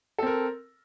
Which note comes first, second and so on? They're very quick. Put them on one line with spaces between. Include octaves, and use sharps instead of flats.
A4 C4 A#4